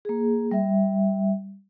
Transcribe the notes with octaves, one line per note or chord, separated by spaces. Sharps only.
A#3 G#4
G3 E5